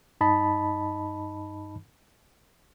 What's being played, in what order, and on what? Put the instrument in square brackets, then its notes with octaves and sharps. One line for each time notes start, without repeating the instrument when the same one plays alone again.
[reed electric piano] G2 D#4 D#5 A5 B5